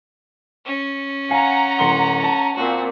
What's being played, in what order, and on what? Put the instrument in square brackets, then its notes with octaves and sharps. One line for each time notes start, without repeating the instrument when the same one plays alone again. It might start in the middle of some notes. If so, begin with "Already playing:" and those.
[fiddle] C#4
[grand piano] F5 G#5 [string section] F#5 A#5
[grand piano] D1 C6 G7
A5
[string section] A#2 C4 [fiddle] F#4